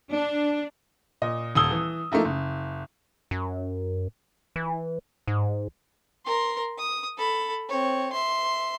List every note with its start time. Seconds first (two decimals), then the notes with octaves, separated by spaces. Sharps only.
0.11 D4
1.22 A#2 D#5
1.55 D#1 D#6 E6 G7
1.71 E3
2.12 F3 A3 A#3 D#4 E4
2.25 F#1
3.31 F#2
4.56 E3
5.27 G#2
6.25 A#4 C6
6.78 D#6
7.17 A4 B5
7.69 C4 C#5
8.12 E5 C6